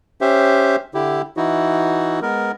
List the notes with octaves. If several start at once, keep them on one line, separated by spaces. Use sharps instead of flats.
C#4 G4 C5 E5
D3 E4 G4
E3 D#4 E4 F#4
G#3 B3 A#4